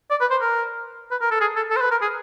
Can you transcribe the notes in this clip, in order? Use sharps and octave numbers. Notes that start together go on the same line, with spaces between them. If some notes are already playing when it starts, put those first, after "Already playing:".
D5
B4
C5
A#4
B4
A#4
A4
G#4
A4
A4
C5
B4
A#4
G#4